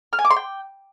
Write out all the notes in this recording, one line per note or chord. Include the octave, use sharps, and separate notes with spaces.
F6
G#5
D6
C6
G5